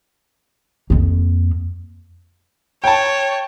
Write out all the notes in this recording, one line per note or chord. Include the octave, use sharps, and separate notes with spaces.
F2 A#3
C#5 G5 A5